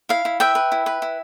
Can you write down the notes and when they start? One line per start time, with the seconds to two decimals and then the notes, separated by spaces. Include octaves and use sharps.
0.09 E4 F5
0.25 E4
0.40 B4 E5 G5
0.55 B4
0.72 E4
0.86 B4
1.02 E4